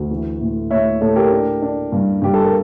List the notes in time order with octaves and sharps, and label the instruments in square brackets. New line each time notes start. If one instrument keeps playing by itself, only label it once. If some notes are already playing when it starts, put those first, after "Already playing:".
Already playing: [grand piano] D2
E3
A2
A2 C#5 E5
A2 A4 C#5
G4 A#4
D4
D4
G2
G2 G4
A4
A#4